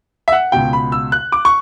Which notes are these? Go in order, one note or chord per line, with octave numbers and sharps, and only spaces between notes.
E5
F#5
C#2 B2 G5
B5
E6
F#6
D6
C#6